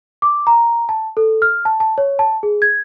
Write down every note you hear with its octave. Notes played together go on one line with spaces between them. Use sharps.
D6
A#5
A5
A4
F6
A5
A5
C#5
A5
G#4
G#6